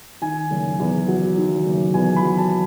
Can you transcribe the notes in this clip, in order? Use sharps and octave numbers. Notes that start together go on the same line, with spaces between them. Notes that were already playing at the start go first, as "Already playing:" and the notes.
D#3 G#5
F#1
E2
F#3
D#3
F#1
E2 G#5
B5
F#3
A5